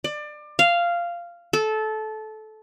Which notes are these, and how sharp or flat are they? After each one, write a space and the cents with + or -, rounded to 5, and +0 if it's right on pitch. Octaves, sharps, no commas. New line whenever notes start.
D5 +25
F5 -10
A4 -20